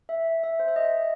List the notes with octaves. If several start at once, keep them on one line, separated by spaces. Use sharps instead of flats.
E5
E5
C5
E5
D#5